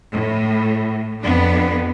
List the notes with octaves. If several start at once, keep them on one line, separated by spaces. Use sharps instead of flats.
A2
F2 B3 D4